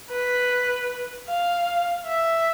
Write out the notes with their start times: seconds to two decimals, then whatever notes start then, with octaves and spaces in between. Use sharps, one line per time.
0.10 B4
1.29 F5
2.07 E5